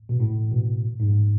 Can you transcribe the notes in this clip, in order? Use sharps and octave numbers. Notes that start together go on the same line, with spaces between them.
B2
A2
B2
G#2